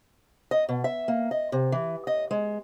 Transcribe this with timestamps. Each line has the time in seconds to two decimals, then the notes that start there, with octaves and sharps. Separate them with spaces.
0.51 D#5
0.69 B2
0.84 E5
1.08 A#3
1.31 D#5
1.52 C3
1.72 E3
2.07 D#5
2.31 G#3